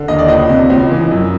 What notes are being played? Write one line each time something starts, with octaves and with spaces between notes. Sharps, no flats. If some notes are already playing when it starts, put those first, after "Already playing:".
Already playing: D3
D#2 D#5
D5
C#2 D#5
C3
C#2
E3
F#2